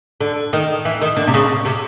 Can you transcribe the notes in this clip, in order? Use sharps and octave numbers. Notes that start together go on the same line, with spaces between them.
D3
D#3
E3
D#3
D3
C3
C#3
C3